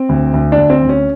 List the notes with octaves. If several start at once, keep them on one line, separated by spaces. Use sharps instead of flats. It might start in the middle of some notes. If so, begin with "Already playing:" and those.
Already playing: C4
D2
D2
D4
D2
C4
D2
C#4